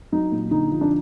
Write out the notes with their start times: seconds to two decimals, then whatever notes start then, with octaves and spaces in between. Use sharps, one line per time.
0.12 F#3 D#4
0.32 A#2
0.51 D3 D#4
0.71 F3
0.81 D4